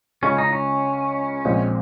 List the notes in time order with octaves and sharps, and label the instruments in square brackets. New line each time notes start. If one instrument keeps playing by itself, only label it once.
[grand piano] C#2 C#3 G#3 [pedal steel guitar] C#4
[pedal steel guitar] D#4
C#4
[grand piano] A#1 A#2 G#3 C4